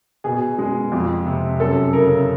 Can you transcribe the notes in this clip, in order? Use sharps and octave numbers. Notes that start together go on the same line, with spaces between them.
B2 G#4
G#3
F2
C3
F#2 A4
C#3 A#4